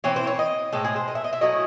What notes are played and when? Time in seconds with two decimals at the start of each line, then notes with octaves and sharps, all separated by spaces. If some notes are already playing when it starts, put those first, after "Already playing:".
0.04 E3 C4 E4 C#5
0.16 C5
0.27 C#5
0.39 D#5
0.72 A2 G#3 C4 A4
0.85 G#4
0.96 C5
1.08 D#5
1.15 E5
1.24 D#5
1.33 E5
1.41 F#3 A3 C#4 E4 D#5